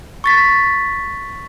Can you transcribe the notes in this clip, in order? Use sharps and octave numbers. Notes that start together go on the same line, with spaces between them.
C#6 A6 B6